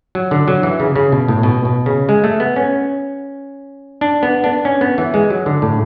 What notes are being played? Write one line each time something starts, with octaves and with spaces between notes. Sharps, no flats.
F#3
D3
F#3
E3
C#3
C#3
B2
A2
B2
B2
C#3
G#3
A3
B3
C#4
D4
B3
D4
C#4
B3
E3
G#3
F#3
D3
A2